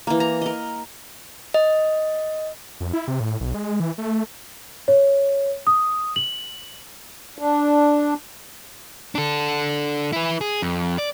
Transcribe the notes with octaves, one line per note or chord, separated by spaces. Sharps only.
E3 A#3
A#5
A#4 D#5
D#5
F2
E4
C3
A2
B1
G#3
E3
A3
C#5
D#6
F#7
D4
D4 A4
E4 B4
G#4
F2
D5